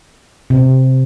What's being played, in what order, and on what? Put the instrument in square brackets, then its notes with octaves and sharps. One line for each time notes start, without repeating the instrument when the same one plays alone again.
[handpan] C3